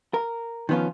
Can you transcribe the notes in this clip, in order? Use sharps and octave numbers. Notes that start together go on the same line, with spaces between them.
A#4
D#3 F3 B3 C#4 F4